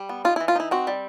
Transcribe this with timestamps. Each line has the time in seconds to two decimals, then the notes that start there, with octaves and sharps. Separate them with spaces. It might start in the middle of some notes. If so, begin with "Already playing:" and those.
Already playing: G3
0.09 B3
0.25 D#4 F4
0.36 E4
0.40 E3
0.48 F4
0.56 D#4 E4
0.71 C4 F#4
0.87 G3